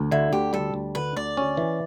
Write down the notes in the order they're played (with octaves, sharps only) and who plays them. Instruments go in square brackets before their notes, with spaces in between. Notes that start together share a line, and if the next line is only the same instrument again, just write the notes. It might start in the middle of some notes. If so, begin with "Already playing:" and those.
Already playing: [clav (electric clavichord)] D2
[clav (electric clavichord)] D3 [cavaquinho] E4
[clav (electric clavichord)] D2 [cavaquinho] G4
[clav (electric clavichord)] G3 [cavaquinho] A4
[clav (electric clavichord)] D2
[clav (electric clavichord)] D3 [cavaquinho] B4
[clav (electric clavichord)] D2 [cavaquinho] D5
[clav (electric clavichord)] C#4
E3